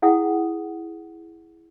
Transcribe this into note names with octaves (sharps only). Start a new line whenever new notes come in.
E4 G#4 F#5 G5 D#6